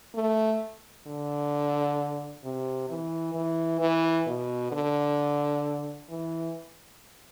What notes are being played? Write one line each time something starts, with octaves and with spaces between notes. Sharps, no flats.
A3
D3
C3
E3
E3
E3
B2
D3
E3